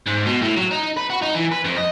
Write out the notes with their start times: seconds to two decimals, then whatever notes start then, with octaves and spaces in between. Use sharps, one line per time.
0.07 G#2
0.26 B2
0.42 A2
0.57 F#3
0.71 D#4
0.97 B4
1.10 F#4
1.22 D#4
1.35 E3
1.52 B4
1.65 F2
1.77 D#5